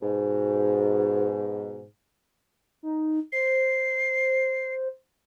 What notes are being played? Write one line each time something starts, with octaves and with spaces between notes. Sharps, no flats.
G#2 B2
D#4
C5 C7